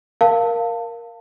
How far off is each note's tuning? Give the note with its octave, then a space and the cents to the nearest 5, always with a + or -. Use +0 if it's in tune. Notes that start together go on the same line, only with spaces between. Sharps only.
A#4 +5 F5 +0 A5 +25